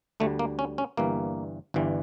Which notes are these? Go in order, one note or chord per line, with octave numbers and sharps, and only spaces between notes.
D2 D3 G3 A3
A#3
C#4
C#4
G1 G2 E3 G3 A#3
G1 G2 E3 G3